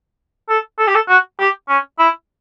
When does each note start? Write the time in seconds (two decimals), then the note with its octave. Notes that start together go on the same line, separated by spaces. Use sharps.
0.49 A4
0.79 A4
0.87 G4
0.95 A4
1.08 F#4
1.39 G4
1.69 C#4
1.99 E4